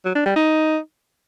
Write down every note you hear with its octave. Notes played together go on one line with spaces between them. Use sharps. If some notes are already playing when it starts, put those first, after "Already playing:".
F#3
D4
G3
D#4